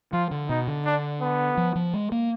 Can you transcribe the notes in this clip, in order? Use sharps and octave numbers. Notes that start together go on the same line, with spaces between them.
F3 F4
D3
B2 D#4
D3
D4
B3
F3
F3
G#3
A#3